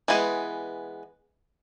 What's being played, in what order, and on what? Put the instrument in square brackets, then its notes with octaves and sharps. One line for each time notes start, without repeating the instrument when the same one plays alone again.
[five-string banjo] E3 G#3 B3 G#4